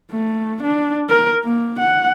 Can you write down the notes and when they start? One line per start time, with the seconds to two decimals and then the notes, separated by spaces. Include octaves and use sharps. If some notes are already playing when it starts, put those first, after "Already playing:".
0.11 A3
0.62 D4
1.09 A#4
1.44 A#3
1.79 F#5